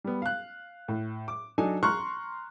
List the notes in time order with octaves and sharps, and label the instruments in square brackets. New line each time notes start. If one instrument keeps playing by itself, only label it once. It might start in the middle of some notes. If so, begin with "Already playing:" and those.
[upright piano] G3 B3
F5 F#6
A2
D6
F#3 D4 D#4 A4 G#5
A#5 C6 C#6 F6 F#6